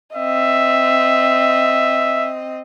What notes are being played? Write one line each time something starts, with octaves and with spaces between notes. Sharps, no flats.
C4 D#5 E5